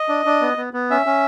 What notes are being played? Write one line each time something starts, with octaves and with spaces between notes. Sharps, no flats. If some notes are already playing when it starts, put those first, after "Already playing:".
Already playing: D#5
D4
D4
B3
B3
B3
C#4 E5
C#4